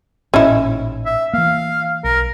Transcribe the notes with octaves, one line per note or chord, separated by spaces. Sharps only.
A1 A#2 C#4 D#4 E4
E5
E3 A#3 F5
B1 A#4